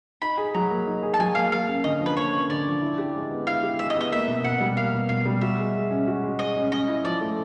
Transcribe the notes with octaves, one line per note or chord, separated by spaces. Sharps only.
D#4 B5
G#4
F#3 A#5
A#3
D#4
G#4
A5
F#3 G#5
A#3 F5
A#3 F5
C#4
D3 D#5
F3
B4
A#3 C#5
C#4
D3 D5
F3
E4
G4
G#3
B3
E4 F5
G4
G#3 E5
D#5
B3
D#5
A#3 E5
B2
B2 F#5
G3
A#3 F5
B2
B2 F5
G3
F#4 E5
G#3
G#3
C#4
F#4
G#3
G#3 D#5
C#4
C#4 D#5
E4
F3 D5
A3